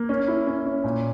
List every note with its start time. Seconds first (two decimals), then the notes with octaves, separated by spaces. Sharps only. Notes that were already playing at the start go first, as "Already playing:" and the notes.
Already playing: A#3
0.09 C#4
0.28 E4
0.47 C#4
0.66 C#4
0.84 A#2